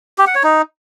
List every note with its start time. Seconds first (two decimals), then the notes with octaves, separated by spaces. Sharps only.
0.18 G4
0.27 F#5
0.35 C#5
0.43 D#4